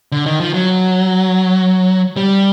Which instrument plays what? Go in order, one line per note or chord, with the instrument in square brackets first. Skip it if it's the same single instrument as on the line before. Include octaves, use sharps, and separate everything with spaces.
[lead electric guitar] D3
D#3
F3
F#3
G3